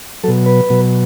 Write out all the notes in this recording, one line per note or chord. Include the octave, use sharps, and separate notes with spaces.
B2 F#3 A4
B4
B2 F#3